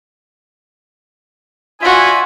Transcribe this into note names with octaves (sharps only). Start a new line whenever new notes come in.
F4 F#4 D5 E5 G#5